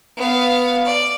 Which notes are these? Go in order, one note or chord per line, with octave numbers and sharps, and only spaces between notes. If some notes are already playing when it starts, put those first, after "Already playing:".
B3 F5
D5